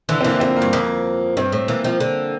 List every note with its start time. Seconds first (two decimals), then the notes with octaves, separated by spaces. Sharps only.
0.09 D3 E3
0.21 C4
0.24 E3 A#3
0.40 F2 C4
0.56 A#3
0.62 G2
0.73 F2 A#3
1.37 G2 C4
1.52 A2
1.68 E3 A#3
1.84 F3 C4
2.00 D3